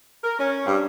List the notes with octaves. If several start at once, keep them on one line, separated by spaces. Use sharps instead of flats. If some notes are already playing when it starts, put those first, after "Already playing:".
A#4
C#4
G2